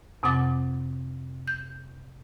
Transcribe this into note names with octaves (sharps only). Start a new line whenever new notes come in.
F2 C3 C4 F#5 D6 A6
G6